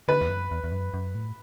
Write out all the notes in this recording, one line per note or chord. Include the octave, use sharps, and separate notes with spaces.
D3 B4
E2
F#2
E2
E2
F#2
F#2
A2